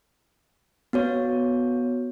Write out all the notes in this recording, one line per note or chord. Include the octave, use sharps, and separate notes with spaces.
B3 F#4 C#5